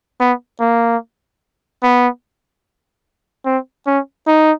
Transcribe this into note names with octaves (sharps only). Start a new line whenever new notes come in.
B3
A#3
B3
C4
C#4
D#4